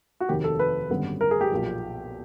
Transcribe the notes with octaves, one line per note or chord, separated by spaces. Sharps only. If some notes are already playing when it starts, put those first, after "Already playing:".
F#4
F1 D#2 D#3 G4
A4
B4
G#1 F#2 D3 G3 B3
A#4
G#4
G4
B1 A#2 F3